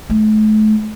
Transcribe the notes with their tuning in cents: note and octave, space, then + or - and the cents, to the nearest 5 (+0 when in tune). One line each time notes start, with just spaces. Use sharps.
A3 -35